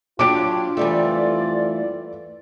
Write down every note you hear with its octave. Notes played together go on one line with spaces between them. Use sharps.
F#3 D4 F4 G4 D6 D7
F2 E3 G3 A3 A4 D5